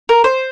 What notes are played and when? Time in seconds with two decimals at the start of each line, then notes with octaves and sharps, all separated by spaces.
0.09 A#4
0.24 C5